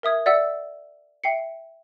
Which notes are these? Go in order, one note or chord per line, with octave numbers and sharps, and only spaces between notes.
A#4 E5 D#6 G#6
D5 E5 F#5 E6 C#7
E5 G5 C7 C#7